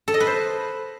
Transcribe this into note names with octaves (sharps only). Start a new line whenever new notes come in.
A4
D#5
B4
C5